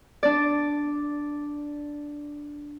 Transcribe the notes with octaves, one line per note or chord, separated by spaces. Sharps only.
D4 D5